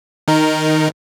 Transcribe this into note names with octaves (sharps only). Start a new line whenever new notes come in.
D#3 D#4 A#4